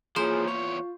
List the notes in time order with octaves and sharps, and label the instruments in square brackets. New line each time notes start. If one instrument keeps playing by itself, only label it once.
[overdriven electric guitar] E3 F3 [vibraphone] A#3 F4 C#5 [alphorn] G#4 [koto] C5
[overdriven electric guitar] E2 C#5 [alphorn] F4 [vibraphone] C#6